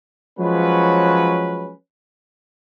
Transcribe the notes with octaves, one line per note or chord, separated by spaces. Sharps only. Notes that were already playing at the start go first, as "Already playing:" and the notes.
F3 F#3 G#3 C#4 B4